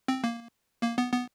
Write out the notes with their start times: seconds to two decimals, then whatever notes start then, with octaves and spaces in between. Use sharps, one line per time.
0.08 C4
0.24 A#3
0.82 A#3
0.98 B3
1.12 B3